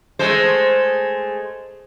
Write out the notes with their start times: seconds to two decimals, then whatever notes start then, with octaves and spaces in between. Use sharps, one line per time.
0.19 G#3 A3 C5